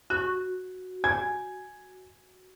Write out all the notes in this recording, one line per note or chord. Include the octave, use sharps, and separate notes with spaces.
F#4 F#6
G#5 G#6